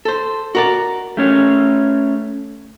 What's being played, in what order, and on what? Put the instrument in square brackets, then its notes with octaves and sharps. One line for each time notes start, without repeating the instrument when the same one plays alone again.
[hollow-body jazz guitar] A4 C5
F#4 A#4 D5
[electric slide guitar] A3 C#4 C#5